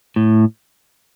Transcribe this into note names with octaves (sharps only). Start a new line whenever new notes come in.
A2